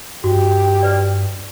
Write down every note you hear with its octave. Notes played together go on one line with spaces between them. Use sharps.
G2 F#4 G4
B4 D5